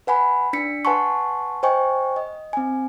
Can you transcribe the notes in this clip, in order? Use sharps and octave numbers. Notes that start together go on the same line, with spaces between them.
B4 F#5 G#5 B5
D4 B6 C#7
B4 F#5 G#5 A5 C6 C#6
C5 D#5 G5 G#5 C#6
D#5
C4 G#5